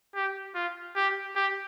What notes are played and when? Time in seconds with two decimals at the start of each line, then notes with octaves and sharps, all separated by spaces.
0.15 G4
0.55 F4
0.96 G4
1.36 G4